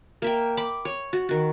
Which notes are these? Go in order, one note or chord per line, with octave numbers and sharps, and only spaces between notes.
A#3 E5 G5
B5 D6
C#5
F#4
D#3 F#4